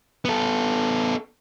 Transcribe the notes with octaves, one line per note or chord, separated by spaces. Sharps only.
B3 A4